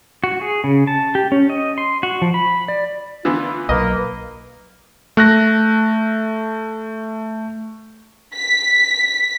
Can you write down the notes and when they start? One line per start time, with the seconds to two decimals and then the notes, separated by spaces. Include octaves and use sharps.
0.24 F#4
0.41 G#4
0.64 C#3
0.87 A5
1.15 G4
1.32 C#4
1.50 D#5
1.78 C6
2.03 F#4
2.22 F3
2.34 B5
2.68 D5
3.25 D3 E3 B3 F4
3.69 B1 B2 F#3 A#3 B4 D#5
5.17 A3 F#6 A#6
8.35 B6